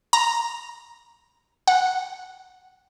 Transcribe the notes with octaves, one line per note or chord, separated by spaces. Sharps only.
A#5
F#5